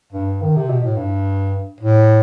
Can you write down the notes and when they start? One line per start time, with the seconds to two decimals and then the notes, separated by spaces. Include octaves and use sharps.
0.12 G2
0.42 D#3
0.56 C3
0.70 B2
0.84 A2
0.97 G2
1.80 A2